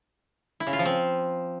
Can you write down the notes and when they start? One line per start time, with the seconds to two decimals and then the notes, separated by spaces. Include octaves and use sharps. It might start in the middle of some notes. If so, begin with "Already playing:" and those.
0.60 E4
0.67 C#3
0.73 F4
0.79 F3
0.85 C4